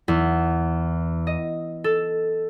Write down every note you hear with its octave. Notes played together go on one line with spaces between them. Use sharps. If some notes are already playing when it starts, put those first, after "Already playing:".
E2
D#5
A4